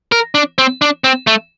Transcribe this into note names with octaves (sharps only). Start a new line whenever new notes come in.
A#4
D4
C4
D4
C4
A3